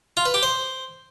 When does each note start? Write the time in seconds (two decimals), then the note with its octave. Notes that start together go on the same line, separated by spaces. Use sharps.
0.17 F4
0.26 B4
0.34 G4
0.43 C5